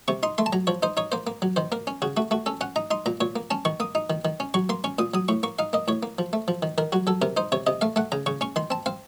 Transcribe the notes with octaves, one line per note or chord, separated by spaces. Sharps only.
C3 C#6
D#4 C6
A3 C6
A5
F#3 A#5
F3 C#5
D#4 C5
D#4 C#5
A#3 C5
A#3
F#3
D#3 C5
A#3 A#4
C#4
C#3 F#4
A3 F#4
A3 F#4
C#4 A4
C#4 F#5
D#4 A#5
D#4 C6
A#2 A#5
A#2 C#5
A#3
C#4 A5
D#3 C#6
A#3 D#6
D#4
D#3
D#3
C#4
F#3 C#6
A#3 C6
C#4 C#6
A#2 D#6
F#3 D#6
A2 C#6
A#3 C#6
D#4 F5
A#3 D#5
A2 C#5
A#3
F3
A3
F3
D#3
D#3 A#4
F#3 F#4
F#3 A4
C3 A#4
D#4 C5
C3 C#5
C3 D#5
A3 F5
A3 F#5
C#3 A#5
C#3 C#6
C#4 C#6
D#3 C6
C4 A5
C4 F5